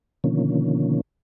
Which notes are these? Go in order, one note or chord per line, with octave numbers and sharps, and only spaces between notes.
B2 D3 D#3 F3 A#3 C#4